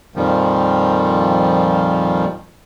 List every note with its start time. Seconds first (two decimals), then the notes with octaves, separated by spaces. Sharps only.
0.16 F2 A#2 D#3 F3 G3